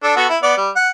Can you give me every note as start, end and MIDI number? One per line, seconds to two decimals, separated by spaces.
0.03 0.14 62
0.03 0.14 69
0.17 0.27 59
0.17 0.27 66
0.17 0.27 69
0.29 0.38 64
0.43 0.54 59
0.43 0.54 74
0.57 0.70 55
0.76 0.89 78